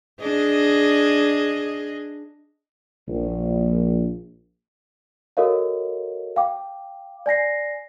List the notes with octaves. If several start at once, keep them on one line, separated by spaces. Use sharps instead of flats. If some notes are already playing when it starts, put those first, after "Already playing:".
D4 G#4 D#5
A#1
F#4 A4 A#4 C#5 D#5 F5
F5 G5 D6
D5 G#5 A#6 C7